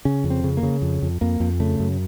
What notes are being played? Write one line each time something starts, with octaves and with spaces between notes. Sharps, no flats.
C#3 C#4
F2
C4
C#3
A#3
C#3
F2
F2
F2 A#3
F2
C#3 A3
F#2